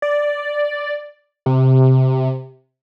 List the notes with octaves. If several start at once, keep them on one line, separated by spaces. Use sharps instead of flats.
D5
C3